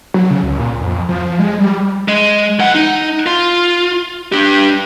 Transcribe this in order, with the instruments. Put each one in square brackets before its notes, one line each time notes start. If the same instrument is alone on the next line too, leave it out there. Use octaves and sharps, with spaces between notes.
[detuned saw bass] F#3
C#3
C#2
A#2
F2
F3
G#3
G3
[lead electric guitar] G#3
E3 F#5
D#4
F4
D4 G4